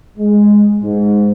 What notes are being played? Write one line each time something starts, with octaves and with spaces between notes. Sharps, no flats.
G#3
G#2